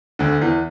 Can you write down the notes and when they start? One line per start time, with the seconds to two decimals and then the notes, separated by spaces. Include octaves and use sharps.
0.19 D2 D3
0.41 E2 E3